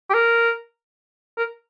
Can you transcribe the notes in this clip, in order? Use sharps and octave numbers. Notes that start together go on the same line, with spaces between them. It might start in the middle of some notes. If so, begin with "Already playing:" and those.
G4
A#4
A#4